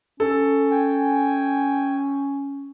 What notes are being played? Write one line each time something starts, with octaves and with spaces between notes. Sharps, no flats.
C#4 A4
G5 G#5